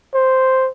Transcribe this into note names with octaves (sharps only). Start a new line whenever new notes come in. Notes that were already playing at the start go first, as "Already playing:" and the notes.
C5